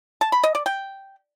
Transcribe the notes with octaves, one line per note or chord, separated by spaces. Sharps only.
A5
B5
D#5
D5
G5